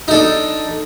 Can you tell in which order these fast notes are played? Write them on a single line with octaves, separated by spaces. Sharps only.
D#4 A4 D4